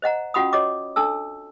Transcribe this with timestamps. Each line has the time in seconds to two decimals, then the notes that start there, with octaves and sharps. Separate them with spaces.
0.02 C5 D#5 F#5 A#5
0.34 C#4 F4 F#4 F#5 B5 D#6
0.53 F#4 C#5 D#5 D6
0.96 D4 A4 A5 E6